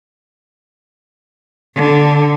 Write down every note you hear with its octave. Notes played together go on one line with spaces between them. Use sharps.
D3